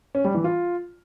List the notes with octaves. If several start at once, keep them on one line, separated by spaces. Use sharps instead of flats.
C#4
G3
E3
F4